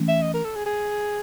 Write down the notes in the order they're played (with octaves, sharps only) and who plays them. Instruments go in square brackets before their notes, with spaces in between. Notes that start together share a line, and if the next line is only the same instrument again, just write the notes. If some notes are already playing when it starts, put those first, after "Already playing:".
Already playing: [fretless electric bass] E3 A3 C#4
[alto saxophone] E5
D#5
A#4
A4
G#4
G#4